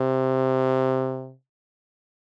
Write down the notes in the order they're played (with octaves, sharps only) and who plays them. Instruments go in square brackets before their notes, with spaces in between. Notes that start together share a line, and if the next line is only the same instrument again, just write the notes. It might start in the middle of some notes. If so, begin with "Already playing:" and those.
Already playing: [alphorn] C3